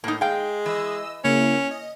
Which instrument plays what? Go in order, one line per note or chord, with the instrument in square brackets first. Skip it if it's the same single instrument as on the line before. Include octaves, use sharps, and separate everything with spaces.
[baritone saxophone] A2 [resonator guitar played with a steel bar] A#3 D#4
[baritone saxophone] G#3 [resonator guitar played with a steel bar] F5 G5
[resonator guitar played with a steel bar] E3 [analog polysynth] D#5 E6
[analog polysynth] C#3 A#3 E4 [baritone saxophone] C#4
[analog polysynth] D#5